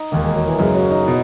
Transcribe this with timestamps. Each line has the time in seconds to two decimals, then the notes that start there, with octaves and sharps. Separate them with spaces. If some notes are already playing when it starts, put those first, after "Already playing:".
Already playing: D#4
0.12 E1 D#2 D#3 A#3
0.24 G#3
0.35 F#3
0.47 E3
0.59 F#2 C#3 F#3 G#3
0.75 F#3
0.90 D#4
1.05 B2 E4